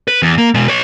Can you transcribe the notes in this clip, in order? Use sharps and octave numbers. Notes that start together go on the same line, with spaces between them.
B4
E2
A#3
B2 G#3
B4 C#5